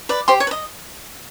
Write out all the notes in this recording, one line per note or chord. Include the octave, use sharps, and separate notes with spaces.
B4 D5
G4 C5 C6
C#5 C#6
B4
D#5